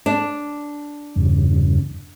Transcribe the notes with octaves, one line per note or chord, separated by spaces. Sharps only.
D4
E2 G2 C#3